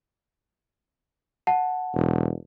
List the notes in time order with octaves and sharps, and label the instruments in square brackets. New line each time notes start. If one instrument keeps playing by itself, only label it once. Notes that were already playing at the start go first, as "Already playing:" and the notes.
[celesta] F#5 A5
[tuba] E1